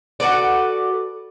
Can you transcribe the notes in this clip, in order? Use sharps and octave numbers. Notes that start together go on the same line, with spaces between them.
F#4 A4 B4 D5